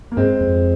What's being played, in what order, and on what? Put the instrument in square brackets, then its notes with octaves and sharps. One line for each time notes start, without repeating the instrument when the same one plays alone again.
[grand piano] A#3
[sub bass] G2 [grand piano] G#3 C4
[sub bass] F2